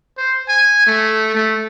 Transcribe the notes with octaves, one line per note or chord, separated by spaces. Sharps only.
C5
G#5
A3
A3